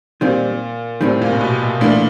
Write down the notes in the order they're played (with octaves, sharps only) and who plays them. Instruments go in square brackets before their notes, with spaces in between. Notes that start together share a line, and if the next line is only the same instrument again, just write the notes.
[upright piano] A#2 [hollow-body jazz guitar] D#3 G3 C4
[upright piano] A2 [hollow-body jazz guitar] D#3 G3 C4
[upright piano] A#2
C3
B2
B2
[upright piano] A#2 [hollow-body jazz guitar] E3 A3 D4